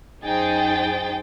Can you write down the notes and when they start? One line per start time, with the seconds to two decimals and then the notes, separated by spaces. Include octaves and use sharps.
0.24 F#2 D#4 G#4 C5 G5 A6